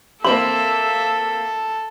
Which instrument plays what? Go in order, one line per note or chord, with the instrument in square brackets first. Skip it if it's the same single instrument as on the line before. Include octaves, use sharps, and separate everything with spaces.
[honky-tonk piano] A#3 C4 F#7 [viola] A4 [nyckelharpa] E5 [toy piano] C6